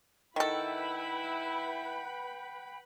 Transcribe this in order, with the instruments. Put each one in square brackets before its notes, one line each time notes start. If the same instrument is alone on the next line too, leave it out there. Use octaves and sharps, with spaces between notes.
[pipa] D#3 A4 [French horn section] E4 [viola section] B4 B5 [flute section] F#5 G5 G6